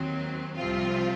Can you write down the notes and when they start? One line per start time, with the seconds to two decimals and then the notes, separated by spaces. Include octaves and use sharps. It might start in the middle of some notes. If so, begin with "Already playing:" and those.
Already playing: D#2 D#3 F#3 C4
0.56 C2 C3 F3 C4 F4